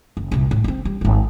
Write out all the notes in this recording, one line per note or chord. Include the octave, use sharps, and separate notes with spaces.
F#1
C2 A#2
A2
A3 C4
G3
D1 G#1